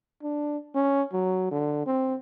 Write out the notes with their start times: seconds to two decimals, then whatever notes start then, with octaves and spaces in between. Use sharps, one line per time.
0.23 D4
0.75 C#4
1.13 F#3
1.51 D3
1.87 C4